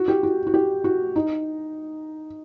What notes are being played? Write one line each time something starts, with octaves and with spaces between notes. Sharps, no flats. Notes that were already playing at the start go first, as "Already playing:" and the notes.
Already playing: F#4
G4
F#4
F#4
G4
F#4
D#4